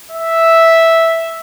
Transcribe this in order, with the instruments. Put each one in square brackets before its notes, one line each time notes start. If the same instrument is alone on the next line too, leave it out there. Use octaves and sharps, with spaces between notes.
[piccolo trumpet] E5